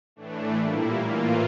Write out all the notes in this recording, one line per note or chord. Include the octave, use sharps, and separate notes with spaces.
A2 E3 A3 D4
A#2 G3 A#3 E4
A2 E3 A#3 F4